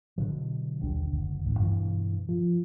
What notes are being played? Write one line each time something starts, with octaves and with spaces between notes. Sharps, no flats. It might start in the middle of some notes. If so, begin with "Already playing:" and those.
B2 D3 F#3
D#1 B1 D3 G3
F#1 D2
A1 D2
G2 B2 D3 E3
F3